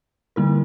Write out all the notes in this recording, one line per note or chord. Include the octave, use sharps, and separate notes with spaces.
D3 G3 A#3 E4 A#4